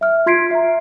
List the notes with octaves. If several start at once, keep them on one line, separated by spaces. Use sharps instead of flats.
E5 F6
F4 C6 G#6 B6 C7 D7
E5 A#5